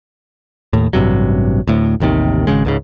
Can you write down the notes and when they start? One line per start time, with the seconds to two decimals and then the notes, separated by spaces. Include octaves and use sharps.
0.73 D#2 A2
0.93 A1 G2 C3 F#3
1.68 D2 A2
2.00 A1 D#2 C3 D#3
2.47 G#1 D#2 C#3 G#3
2.65 C#2 G#2 C#3